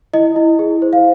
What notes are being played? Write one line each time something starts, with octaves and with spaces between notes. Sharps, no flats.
E4 D#5
E4
G#4
C5
F5